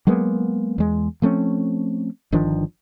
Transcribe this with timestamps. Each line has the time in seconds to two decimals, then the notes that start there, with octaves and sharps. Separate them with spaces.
0.07 F#3 G#3 A#3 B3
0.78 E2 G#3
1.22 F3 A3 C4 C#4
2.32 G1 D#3 F3 D4